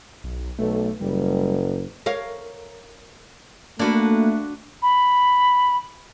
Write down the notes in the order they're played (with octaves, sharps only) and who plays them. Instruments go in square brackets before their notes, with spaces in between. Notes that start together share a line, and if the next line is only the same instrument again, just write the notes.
[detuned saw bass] B1
[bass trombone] B1 [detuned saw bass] A3
[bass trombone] F#1 [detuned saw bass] G3
[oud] A#4 C#5 F5
[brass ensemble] A3 [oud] A#3 [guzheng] D4 F#4 B4
[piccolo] B5